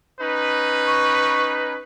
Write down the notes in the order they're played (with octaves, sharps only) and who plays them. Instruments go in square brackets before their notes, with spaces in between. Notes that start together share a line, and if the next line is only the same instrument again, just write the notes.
[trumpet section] C#4 D#4 B4
[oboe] C#6